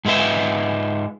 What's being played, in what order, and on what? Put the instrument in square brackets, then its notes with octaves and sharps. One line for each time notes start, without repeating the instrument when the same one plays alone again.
[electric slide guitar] G#2 G#3 F4 B4 E5